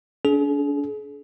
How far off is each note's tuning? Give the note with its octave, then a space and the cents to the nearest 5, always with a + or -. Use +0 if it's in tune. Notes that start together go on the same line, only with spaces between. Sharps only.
D4 -40 G#4 +40